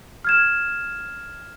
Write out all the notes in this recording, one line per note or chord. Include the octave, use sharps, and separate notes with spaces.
F6 G#6 E7